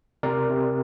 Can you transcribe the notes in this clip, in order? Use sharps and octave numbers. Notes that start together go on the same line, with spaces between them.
C3 A#4 D5
C3